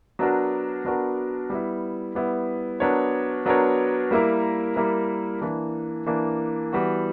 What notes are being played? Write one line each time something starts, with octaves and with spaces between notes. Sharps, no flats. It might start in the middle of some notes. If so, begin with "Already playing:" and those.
F#3 B3 D4 F#4 A#4
F#3 B3 D4 F#4 A#4
G3 B3 E4
G3 B3 E4
F#3 B3 D4 A#4 C#5
F#3 B3 D4 A#4 C#5
G3 A#3 E4 A#4
G3 A#3 E4 A#4
E3 A#3 D4
E3 A#3 D4
E3 G3 B3 F#4